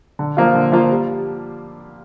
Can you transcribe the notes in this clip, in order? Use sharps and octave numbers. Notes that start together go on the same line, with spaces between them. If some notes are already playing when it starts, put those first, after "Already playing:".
D3
F3 A#3 F4
D3
F3 A#3 F4
G3